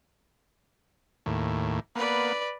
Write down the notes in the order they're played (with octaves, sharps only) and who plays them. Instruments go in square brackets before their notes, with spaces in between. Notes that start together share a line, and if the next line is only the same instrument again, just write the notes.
[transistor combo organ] D#2 A2
[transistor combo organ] A#3 B3 [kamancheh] B4 D5